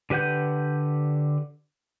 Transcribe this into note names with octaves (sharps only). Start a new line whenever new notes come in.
D3 G4 B4 F#5 G6